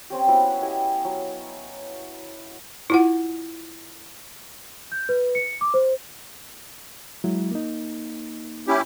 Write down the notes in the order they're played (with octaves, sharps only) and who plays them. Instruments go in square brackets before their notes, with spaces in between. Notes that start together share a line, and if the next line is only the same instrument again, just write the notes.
[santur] C4 C#4 G4
B3 E4 F#4
E4 G4 D#5 G#5
F#3
[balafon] E4 F4 F#5
[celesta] G6
B4
C#7
D6
C5
[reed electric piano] F#3 G#3 E4
A#3 D#4
[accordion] C#4 E4 G4